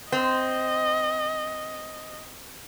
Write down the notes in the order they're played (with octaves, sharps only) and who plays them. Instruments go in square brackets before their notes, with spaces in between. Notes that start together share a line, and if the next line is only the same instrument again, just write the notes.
[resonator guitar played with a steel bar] C4 [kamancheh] D#5